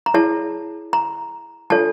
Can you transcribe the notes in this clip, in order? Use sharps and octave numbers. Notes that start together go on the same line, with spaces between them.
A#5
E4 G#4 C#5 A5
A#5
D4 F4 A4 C#5 A5